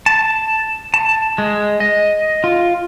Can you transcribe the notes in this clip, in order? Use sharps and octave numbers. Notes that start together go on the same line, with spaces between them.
A5
A5
G#3
D#5
F4